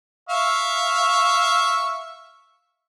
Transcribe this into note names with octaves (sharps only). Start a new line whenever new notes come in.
E5 F5 C#6